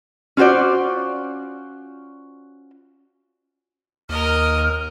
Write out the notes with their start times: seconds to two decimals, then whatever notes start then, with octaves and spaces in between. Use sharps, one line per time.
0.37 C#4 F4 F#4 C5 D5
4.09 D#2 A#4 D#5 F6